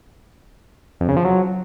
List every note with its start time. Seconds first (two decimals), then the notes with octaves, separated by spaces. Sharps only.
1.00 F2
1.08 C#3
1.17 F3
1.25 F#3